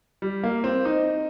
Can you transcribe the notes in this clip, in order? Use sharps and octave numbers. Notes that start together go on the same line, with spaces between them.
G3
A#3
C4
D#4